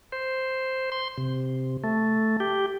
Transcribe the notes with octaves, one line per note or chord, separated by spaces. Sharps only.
C5
C6
C3
A3
G4